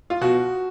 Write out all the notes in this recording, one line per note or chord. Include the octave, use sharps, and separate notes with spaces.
F4
B2 F#4